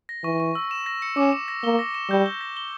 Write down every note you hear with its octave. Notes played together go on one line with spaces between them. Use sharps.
A#6
E3 C#6
C#6
E6
E7
A#6
C#7
C#4 D6
E7
A#6
A#3 G7
A#6
E7
G3 G6
G7
A#6
G7